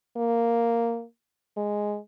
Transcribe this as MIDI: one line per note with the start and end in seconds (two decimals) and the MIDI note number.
0.17 1.04 58
1.57 1.97 56